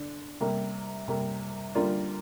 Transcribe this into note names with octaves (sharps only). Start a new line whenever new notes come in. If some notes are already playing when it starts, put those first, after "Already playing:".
Already playing: D3 D4
C3 G3 A#3
C3 G3 A#3
D3 G3 A#3 F4 D5